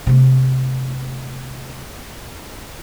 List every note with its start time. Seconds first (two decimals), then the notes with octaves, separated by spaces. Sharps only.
0.07 C3 A3